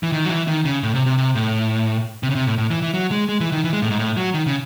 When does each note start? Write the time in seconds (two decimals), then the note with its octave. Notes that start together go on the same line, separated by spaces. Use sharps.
0.03 E3
0.12 D#3
0.25 F#3
0.29 E3
0.48 D#3
0.65 C#3
0.83 A2
0.95 C3
1.06 C3
1.18 C3
1.35 A2
2.23 C3
2.30 C#3
2.35 C3
2.47 A2
2.58 A2
2.70 E3
2.82 E3
2.94 F#3
3.11 G#3
3.29 G#3
3.40 E3
3.52 D#3
3.64 E3
3.73 G#3
3.82 A2
3.90 G#2
3.99 A2
4.17 F#3
4.34 D#3
4.47 C#3